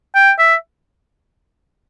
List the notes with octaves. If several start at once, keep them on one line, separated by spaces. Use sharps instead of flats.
G5
E5